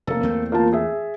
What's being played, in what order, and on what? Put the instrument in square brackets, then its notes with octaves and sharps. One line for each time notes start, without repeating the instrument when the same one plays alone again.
[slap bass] F1 [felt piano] A#3 A4
[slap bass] E2 A3 C4
[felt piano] A#3 F4 A5
G#4 E5